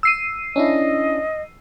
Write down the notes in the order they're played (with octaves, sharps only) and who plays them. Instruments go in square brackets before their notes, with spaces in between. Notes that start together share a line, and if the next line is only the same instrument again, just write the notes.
[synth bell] E6 C7 D#7
[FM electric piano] C#4 D4 E4 [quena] D#5